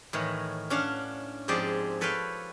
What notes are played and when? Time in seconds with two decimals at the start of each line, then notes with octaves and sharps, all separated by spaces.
0.13 A2 D#3 E3 C#5
0.70 C#4 D4 F5 F#5
1.48 G#2 F3 C4 G4 G#4 D5
2.01 A4 B4 C#5 F5 G5